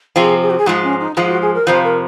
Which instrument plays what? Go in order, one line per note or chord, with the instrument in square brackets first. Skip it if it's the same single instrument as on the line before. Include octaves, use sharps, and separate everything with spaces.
[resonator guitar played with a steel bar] C3 F3 C4 [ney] G#4
[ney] G#4
F#4
G#4
[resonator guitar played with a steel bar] G#2 F3 G#3 [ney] F4
[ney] C#4
D#4
[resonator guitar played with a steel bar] G#2 F3 G#3 [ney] F4
[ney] F#4
G#4
A#4
[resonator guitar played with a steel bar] F2 C3 F3 [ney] C5
[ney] A#4